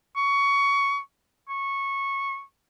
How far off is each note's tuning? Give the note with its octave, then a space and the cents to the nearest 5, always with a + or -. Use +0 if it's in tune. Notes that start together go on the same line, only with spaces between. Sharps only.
C#6 +20
C#6 -15